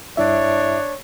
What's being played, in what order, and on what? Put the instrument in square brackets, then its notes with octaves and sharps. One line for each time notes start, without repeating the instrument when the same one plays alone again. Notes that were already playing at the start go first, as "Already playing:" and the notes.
[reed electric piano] G2 E4 E5 [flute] D4 [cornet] C#5